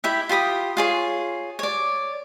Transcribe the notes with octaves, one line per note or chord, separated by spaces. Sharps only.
E4 G4 E5
F4 G4 B5 D#6
F4 G#4 C#5
C#5 D5